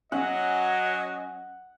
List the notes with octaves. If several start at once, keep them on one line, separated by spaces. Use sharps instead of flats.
F#3 C#4 D#5 F#5